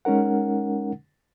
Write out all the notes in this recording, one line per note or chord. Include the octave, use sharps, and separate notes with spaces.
G#3 C#4 D#4 A#4 F#5